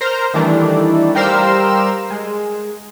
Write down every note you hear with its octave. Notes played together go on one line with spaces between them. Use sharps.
A#4 C5 A#5
D#3 E3 G3 A3 D4
G3 G4 A#4 C5 F5 E6
G#3